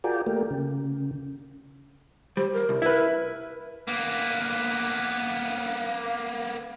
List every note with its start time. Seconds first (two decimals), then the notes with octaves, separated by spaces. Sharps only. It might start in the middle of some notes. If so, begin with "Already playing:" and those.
0.04 F4 F#4 G#4 A#4 D5 G5
0.27 A3 A#3 G4 A#4
0.50 C#3
2.37 G3 C5
2.53 A#4
2.69 C2
2.82 E4 B4 E5
3.88 A#3 B3